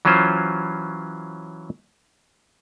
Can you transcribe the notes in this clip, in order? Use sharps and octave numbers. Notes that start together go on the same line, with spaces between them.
E3 F#3 C#4 F4 C5